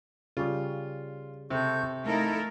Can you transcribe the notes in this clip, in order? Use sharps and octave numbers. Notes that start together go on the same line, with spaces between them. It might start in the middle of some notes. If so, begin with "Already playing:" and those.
C#3 G3 F4
C3 A4 C#6 G6
A3 D#4 E4 A4 A#4 F5